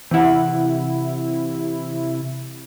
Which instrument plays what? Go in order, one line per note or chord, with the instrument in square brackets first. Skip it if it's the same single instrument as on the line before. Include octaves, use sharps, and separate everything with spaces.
[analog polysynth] C3 E4 [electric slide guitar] E3 F#5